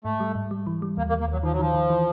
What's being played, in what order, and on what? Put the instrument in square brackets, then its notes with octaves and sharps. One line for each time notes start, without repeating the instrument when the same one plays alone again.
[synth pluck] G#2 [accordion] A3
[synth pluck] G3
G#2
G3
E3
G3
[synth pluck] D#2 [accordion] A#3
[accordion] A#3
[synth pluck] D#2
[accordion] A#3
[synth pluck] D#2 [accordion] F#3
[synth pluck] D#3 [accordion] F3
[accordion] F#3
[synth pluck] D#3 [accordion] F3
[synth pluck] D#3
E3